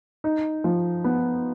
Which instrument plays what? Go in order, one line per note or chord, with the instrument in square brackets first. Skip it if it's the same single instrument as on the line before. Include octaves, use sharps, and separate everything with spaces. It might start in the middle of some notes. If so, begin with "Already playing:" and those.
[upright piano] D#4
F3
B3